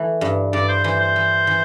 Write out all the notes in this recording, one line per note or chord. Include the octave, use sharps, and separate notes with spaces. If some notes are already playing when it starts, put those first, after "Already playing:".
Already playing: E3 A3
G2
G2 D5
C5
E3 C5
C5
E3
E3